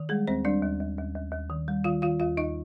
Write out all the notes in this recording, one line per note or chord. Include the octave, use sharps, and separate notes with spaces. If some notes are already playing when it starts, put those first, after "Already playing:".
Already playing: D#3
G3 G#3 G#4
D#2 C4 C5
G3 D4 D5
D#2
D#2
D#2
D#2
D#2
D#3
G3
D#3 F4 F5
D#3 F4 F5
D#2 F4 F5
D#2 D#4 D#5